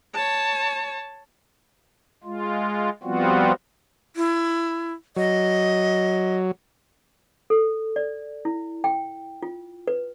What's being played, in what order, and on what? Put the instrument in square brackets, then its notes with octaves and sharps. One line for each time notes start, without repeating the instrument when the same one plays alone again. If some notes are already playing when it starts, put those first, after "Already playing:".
[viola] C#5 A5
[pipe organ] G#3 F4
F3 G3 B3 C4 F4 F#4
[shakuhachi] E4
[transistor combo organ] F#3 [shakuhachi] D#5
[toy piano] A4
D5
E4
G5
F4
B4